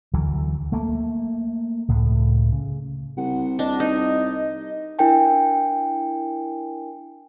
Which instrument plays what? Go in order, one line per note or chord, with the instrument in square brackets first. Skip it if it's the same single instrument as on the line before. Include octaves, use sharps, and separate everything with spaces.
[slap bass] D2 E3 F#3
A3 A#3
C#2 A2
C#3
[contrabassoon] C2 [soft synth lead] F#5
[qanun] D4 [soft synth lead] D#5
[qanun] D#4
[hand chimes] D4 E4 A#4 G5 G#5